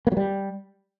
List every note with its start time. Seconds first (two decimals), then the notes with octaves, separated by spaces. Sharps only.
0.07 A#3
0.12 F#3
0.17 G3